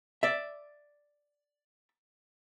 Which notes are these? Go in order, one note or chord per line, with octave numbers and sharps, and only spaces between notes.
D5 E5